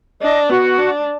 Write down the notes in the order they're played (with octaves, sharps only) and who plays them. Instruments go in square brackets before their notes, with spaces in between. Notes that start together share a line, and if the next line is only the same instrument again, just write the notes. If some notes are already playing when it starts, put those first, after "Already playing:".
[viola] D4 [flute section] D#5
[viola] B3 [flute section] F#4
[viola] D4